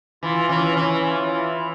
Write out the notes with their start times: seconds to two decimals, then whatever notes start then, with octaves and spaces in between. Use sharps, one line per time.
0.23 E3 F4
0.49 E3 C#4
0.76 E3 C#4
1.03 F4
1.30 E4
1.57 E4